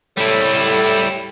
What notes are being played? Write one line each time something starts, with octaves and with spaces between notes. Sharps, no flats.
A2 G3 E4